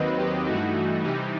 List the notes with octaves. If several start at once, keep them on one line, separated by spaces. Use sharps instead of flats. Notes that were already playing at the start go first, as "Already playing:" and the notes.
Already playing: D#2 D#3 F#3 C4 B4 D#5
G4
G2 E3 A3 D#4 F#4
C3 E3 G3 D#4